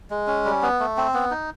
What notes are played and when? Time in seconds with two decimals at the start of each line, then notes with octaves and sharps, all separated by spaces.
0.10 G#3
0.27 C#4
0.45 G3
0.62 B3
0.80 A3
0.97 C4
1.14 B3
1.31 D#4